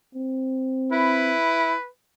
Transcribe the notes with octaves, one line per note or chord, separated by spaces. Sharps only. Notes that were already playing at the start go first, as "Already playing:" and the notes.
C4
E4 B4